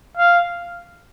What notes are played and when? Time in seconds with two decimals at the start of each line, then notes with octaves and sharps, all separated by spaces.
0.18 F5